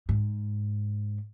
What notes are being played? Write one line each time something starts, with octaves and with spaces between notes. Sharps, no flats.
G#2